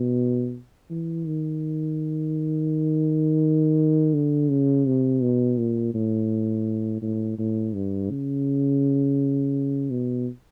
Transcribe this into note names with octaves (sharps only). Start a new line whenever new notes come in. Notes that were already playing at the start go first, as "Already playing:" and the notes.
Already playing: B2
E3
D#3
D3
C#3
C3
B2
A#2
A2
A2
A2
G2
C#3
B2